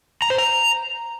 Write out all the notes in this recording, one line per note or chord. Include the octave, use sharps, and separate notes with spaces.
A#5
C5
A#5